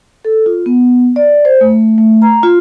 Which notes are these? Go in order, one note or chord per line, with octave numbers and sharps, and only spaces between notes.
A4
F4
B3
D5
C5
A3
A3
A#5
F4